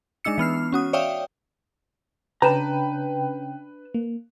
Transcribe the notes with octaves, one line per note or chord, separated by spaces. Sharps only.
G#3 D4 D#4 E6 C#7
E3 B3 F6 C7
C#4 F#4 D#6
C#5 D5 E5 F5 G5 D#6
C#3 C#4 D4 B4 G5 A5 A#5
A#3